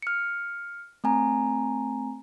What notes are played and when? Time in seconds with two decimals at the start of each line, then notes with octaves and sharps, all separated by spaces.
0.02 F6 C#7
1.04 A3 C4 G#5 A#5